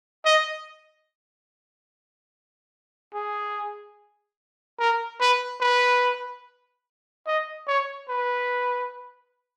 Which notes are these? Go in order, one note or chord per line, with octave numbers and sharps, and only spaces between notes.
D#5
G#4
A#4
B4
B4
D#5
C#5
B4